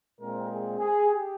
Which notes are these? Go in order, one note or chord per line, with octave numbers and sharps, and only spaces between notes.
A#2 G#3 C4 A#4
G#4
G#4
G4